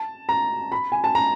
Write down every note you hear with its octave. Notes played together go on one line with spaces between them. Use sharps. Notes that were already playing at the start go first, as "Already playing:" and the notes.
Already playing: A5
A#5
B5
G#5
A5
A#5